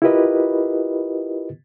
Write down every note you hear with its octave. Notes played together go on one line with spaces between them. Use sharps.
E4 F4 G4 A#4 B4 D#5